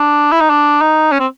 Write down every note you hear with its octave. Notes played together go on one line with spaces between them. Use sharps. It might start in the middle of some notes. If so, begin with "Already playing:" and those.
Already playing: D4
E4
D#4
D4
D#4
C#4
C4